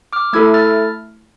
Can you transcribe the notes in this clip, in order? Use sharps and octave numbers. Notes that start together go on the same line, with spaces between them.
D6 F6
A3 E4 A4 E6 G#6
F6 A6